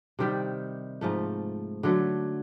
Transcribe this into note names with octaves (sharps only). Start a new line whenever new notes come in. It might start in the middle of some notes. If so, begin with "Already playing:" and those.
C3 D#3 G3
G#2 F3 A3
D3 F#3 A3